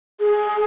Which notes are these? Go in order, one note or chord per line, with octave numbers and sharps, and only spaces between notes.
G#4